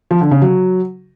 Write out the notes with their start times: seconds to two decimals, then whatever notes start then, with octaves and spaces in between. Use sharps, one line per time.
0.11 F3
0.21 D3
0.31 C#3
0.42 F#3